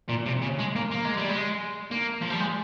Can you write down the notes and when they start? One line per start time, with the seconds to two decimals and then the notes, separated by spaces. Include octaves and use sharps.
0.09 A#2
0.26 C3
0.42 C#3
0.59 G#3
0.76 A#3
0.91 A#3
1.05 G#3
1.17 G3
1.30 G#3
1.91 A#3
2.21 F3
2.30 G3
2.40 G#3